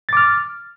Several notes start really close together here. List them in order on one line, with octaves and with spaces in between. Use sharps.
A6 D6 F6